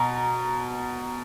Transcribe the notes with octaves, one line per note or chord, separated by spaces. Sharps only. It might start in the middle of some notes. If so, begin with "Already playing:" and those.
Already playing: B2 A#5